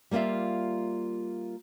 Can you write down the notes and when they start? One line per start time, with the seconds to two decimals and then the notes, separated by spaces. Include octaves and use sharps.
0.11 G3 A#3 F4 D5 E5